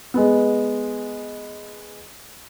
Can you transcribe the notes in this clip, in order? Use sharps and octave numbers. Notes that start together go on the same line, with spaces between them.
G#3 B3